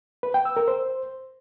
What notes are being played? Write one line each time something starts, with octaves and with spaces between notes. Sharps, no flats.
B4
G5
E6
A#4
C5